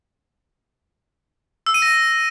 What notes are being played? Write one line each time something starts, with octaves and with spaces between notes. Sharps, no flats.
E6
D#7
A#6